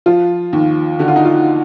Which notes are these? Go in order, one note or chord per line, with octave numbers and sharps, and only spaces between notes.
F3 F4
D#2
D3 F#4
F4
D#4
F4